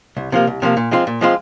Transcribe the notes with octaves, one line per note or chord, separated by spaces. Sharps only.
C2
C3 F3 A#3
C2
C3 F3 A#3
A#2
F3 G#3 C4 F4
A#2
F3 G#3 C4 F4